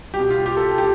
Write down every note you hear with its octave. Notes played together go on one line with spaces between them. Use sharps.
G3 G4
B2
F4
G4
A4
G4